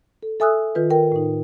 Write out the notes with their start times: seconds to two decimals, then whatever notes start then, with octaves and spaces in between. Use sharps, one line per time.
0.23 A4
0.40 A4 E5 G#5 D#6 E6 F#6
0.75 D#3 F4 B4
0.91 A#4 G5
1.12 A2 D#4